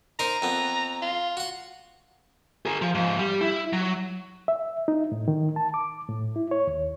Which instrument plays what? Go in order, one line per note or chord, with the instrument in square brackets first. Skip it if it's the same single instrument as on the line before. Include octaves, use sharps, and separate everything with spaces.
[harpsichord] D#4 A#4 C5 [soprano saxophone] A#5
[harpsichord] F2 B3
[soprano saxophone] F4
[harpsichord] F#4 F#5
[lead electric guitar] G#4 A#4
F3
G#2 F3
G3
E4
F#3
[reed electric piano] E5
D#4
A2
D#3
A5
D6
A2
E4
C#5
D#2